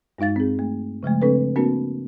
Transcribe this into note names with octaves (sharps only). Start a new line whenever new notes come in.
G2 G#3 D#4 F5 A6
C4 G#4
A3
C#3 F3 G#3 A3
C#3 C4 D4 A4 B4
A#3 C4 D4 F#4 A#4